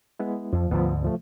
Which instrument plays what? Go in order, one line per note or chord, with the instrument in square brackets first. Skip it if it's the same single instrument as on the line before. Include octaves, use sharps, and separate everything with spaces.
[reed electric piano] G#3 B3 E4
[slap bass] F2 [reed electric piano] F3
[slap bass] D2 G#2 D3 [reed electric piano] F3 B3
[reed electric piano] C3 F3 A3